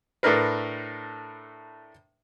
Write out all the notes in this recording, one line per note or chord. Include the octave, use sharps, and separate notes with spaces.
A2 A3 D4 A#4 B4